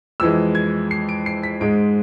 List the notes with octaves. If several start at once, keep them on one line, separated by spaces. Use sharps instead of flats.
F2 E3 G#3 E6
G#6
C7
D7
C7
B6
G#2 G#3 D7